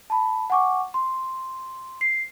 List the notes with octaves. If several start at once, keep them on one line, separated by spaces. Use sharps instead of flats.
A5 B5
F#5 G#5 C#6 D6
C6
C7